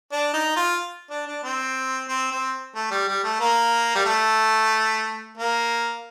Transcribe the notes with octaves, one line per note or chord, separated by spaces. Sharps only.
D4
D#4
F4
D4
D4
C4
C4
C4
A3
G3
G3
A3
A#3
G3
A3
A#3